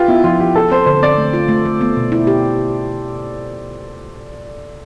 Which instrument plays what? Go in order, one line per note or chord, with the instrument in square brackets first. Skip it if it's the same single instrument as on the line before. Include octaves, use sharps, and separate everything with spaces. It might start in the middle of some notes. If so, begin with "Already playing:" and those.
Already playing: [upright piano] F4 G4 B4
[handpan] B3 [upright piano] E4
[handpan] F3 [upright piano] F4
[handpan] F3 [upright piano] G4
[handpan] F3 [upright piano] A4
[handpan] C4 [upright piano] C5
[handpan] D3 [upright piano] C5
[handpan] C4 [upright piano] D5
[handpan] A3
F4
A3
A3
B3
B2
E4
G4